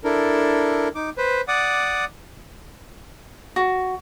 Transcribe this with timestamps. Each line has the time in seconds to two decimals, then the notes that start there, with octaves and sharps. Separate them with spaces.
0.04 D4 E4 A4 A#4
0.95 D#4 D6
1.18 B4 C5
1.48 D5 F#5 D6 D#6
3.56 F#4